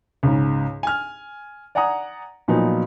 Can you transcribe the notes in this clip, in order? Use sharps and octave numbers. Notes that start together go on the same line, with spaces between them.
C#2 G#2
G#5 F6
D5 F#5 G#5 A#5 D#6
A#2 F3 F#3 B3 D#4